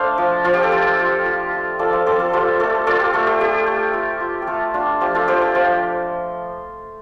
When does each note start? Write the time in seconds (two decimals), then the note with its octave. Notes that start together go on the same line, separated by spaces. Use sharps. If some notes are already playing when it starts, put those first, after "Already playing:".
Already playing: A3 D4 A4 C5 D5 F5
0.18 F3
0.44 F3 F4
0.54 G4
0.63 A4
0.72 F4 G4 C5
0.99 F4
1.25 F4
1.53 F4
1.79 F3 A4 D5
1.93 C5 F5
2.06 C4 A4 D5
2.19 F4 A4
2.33 F4 G4 C5
2.59 A3 A4 D5
2.87 F4 A4 D5
3.00 G4
3.13 A3 F4 A4
3.27 G4
3.40 F4 G4
3.67 A3
3.93 F4
4.20 F4
4.42 G4
4.47 A3 F4 A4
4.74 D4 F4
5.01 F3 G4
5.14 F4 A4
5.28 F3 G4 C5
5.41 G4
5.55 F3 F4